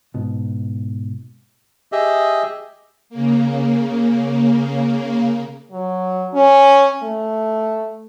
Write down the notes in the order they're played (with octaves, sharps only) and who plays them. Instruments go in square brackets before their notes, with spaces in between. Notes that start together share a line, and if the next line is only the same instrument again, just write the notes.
[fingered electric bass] G#2 B2
[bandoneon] G4 G#4 D#5 E5
[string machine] C#3 A#3
[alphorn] F#3
C#4
A3